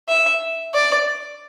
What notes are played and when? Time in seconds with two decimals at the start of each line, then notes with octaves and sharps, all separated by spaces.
0.08 E5
0.74 D5